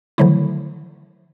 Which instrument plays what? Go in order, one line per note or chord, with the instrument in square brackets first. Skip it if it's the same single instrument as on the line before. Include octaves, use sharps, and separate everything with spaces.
[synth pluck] D3 D#3 F3 F#3 A3 E4